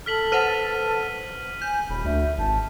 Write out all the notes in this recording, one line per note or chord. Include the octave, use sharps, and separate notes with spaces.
A4 F6 B6 F#7
B4 C5 F#5 F6 D#7
G#5 G6
D#1 B5
D2 E5
G#1 A5